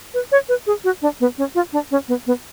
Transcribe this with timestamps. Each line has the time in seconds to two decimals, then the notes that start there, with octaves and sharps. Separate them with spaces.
0.14 B4
0.32 C#5
0.49 B4
0.67 G#4
0.84 F#4
1.02 D4
1.20 B3
1.38 C#4
1.55 F4
1.73 D4
1.91 C#4
2.08 B3
2.27 B3